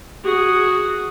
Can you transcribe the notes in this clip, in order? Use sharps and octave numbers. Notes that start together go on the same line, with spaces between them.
F#4 G#4